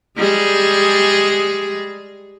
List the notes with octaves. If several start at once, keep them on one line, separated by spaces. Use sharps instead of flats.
G3 G#3 G#4